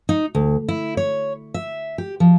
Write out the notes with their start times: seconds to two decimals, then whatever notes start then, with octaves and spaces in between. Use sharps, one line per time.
0.09 D#4
0.35 D2
0.68 E4
0.97 C#5
1.54 E5
1.98 G4
2.20 F3